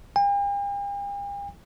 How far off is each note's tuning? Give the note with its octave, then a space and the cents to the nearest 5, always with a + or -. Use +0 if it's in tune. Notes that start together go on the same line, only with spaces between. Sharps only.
G5 +45